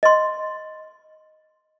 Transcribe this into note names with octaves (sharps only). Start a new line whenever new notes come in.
D#5 C6